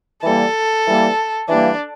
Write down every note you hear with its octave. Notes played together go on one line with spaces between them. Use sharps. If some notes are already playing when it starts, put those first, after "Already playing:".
E3 G3 A#3 A4
E3 G3 A#3
E3 G3 A#3 D4